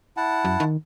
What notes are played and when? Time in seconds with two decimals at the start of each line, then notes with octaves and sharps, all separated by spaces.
0.17 E4 F#5 A5
0.45 F#2
0.60 D#3